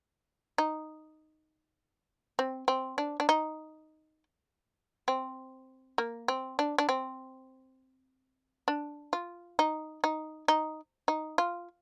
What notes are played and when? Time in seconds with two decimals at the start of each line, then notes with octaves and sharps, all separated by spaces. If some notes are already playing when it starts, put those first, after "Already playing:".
0.58 D#4
2.39 C4
2.68 C4
2.98 D4
3.20 D4
3.29 D#4
5.08 C4
5.98 A#3
6.28 C4
6.59 D4
6.78 D4
6.89 C4
8.68 D4
9.13 F4
9.59 D#4
10.04 D#4
10.48 D#4
11.08 D#4
11.38 F4